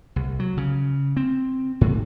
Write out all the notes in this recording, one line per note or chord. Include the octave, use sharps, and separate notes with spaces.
C2
F#3
C#3
C4
G#2